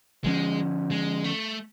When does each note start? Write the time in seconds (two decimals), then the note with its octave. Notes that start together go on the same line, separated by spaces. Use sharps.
0.24 D3 F3 G#3 A#3 C#4
0.91 G#3
1.24 A3